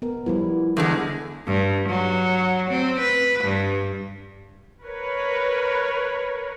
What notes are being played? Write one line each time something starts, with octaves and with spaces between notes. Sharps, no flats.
B3 A#4
F3 G3 B3 E4
E2 D3 E3 G#3
G2
F#3
C4
B4
G2
A#4 B4 C#5